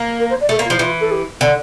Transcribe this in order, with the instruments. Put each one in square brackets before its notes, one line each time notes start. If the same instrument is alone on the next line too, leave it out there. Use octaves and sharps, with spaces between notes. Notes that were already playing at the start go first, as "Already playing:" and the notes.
Already playing: [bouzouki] A#3
[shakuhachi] A#4
C5
D5
[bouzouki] A3 [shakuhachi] A4
[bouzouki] A#3
[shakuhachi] F4
[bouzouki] F3
[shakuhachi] E4
[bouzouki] E3 [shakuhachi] F4
[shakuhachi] A4
G4
[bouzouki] D3 [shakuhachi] A4